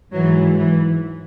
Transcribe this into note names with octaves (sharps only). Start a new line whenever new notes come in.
G#2 E3 F#3
E3